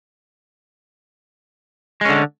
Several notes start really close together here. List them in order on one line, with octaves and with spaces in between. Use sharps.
G#3 C#4 D3